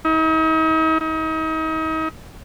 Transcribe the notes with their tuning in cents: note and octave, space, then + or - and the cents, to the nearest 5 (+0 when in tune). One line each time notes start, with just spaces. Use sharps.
D#4 +40
D#4 +35